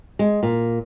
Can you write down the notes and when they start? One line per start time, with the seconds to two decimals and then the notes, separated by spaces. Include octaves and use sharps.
0.19 G#3
0.43 A#2